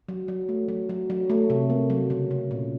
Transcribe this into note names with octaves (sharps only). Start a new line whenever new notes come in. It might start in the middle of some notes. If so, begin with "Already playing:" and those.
F#3
F#3
A3
F#3
F#3
F#3
A3
C3
A#3
F#3
C#3
C#3
A#2